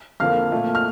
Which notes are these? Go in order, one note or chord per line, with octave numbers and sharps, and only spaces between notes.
F2 D3 F3 A#3 F5 F6
A#2 F3 A3
F6